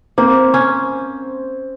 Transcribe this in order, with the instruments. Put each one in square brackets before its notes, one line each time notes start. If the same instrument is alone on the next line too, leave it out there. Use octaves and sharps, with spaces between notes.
[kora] A#3 [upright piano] C4
[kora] C#4